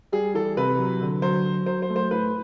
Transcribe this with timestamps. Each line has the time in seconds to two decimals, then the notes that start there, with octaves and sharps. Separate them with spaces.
0.12 G3 G#4
0.34 E3 A4
0.57 C3 B4
0.78 F#3
1.01 D3
1.22 F#3 C5
1.45 F#3
1.66 F#3 C5
1.82 C5
1.90 A3
1.96 C5
2.11 A2 B4